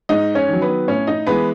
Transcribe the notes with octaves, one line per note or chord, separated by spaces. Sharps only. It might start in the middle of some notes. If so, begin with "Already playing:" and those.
G#2 D#4 D#5
C#4 C#5
D#3 F#3
B3 B4
A2 C#4 C#5
D#4 D#5
E3 G#3 B3 B4